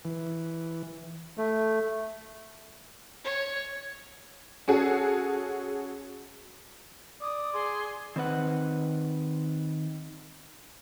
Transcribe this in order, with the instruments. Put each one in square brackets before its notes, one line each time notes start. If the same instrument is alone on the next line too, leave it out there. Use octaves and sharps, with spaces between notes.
[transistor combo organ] E3
[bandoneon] A3
[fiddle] C#5
[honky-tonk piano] C#4 F#4 G#4 A4
[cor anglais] D5 [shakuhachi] D#6
[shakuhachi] G#4 [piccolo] C6
[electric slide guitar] D#3 C4 B4 F#5